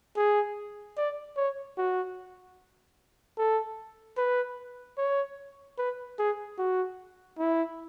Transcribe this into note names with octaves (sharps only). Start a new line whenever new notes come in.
G#4
D5
C#5
F#4
A4
B4
C#5
B4
G#4
F#4
E4